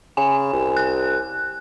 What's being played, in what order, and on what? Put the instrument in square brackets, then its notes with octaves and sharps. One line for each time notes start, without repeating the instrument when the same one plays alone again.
[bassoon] C#3 [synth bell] G#5
[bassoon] C2
[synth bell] F#6